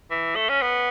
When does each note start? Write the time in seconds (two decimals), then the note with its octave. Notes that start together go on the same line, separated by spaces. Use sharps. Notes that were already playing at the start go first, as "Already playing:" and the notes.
0.11 E3
0.36 A3
0.49 C#4
0.62 B3